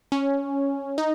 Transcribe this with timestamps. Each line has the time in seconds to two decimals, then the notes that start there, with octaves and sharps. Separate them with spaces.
0.12 C#4
0.98 D#4